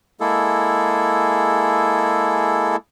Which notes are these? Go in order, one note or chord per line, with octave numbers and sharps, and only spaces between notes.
G#3 A#3 E4 G#4 A4